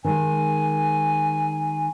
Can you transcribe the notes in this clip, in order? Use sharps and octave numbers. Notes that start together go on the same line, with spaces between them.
D#3 G#3 G#5